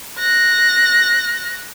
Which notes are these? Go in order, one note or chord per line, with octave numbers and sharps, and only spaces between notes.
F#6 A#6